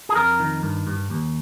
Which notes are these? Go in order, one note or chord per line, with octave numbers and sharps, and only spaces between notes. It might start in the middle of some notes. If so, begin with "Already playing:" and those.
G#4
F2 A#4
D#3
G2
G2
D#2